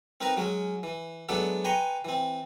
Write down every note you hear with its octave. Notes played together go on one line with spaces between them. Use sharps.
C4 D#4 A#4 B4 A#5
F#3 G#3 C#4
E3
F#3 G#3 B3 D4 E4 A4
B4 G5 G#5 A#5 C6 C#6
E3 C4